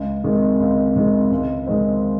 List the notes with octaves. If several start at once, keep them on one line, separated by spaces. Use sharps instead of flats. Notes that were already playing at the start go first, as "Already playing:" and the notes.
Already playing: C#2
C3 D#3 G#3
C#2
C3 D#3 G#3
C#2
C3 D#3 G#3 C4